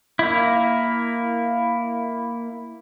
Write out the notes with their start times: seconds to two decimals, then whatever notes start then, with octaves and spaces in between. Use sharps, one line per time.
0.19 A#3 E4